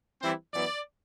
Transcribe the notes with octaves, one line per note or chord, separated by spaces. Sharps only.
E3 G3 C4 E4 C5
F#2 E3 B3 D5